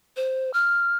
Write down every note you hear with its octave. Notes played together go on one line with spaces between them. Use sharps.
C5
F6